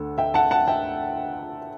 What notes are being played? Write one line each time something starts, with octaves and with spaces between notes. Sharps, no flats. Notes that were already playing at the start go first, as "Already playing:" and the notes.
Already playing: D2 D3 A4
E5 G5
F#5 A5
F#5 A5
E5 G5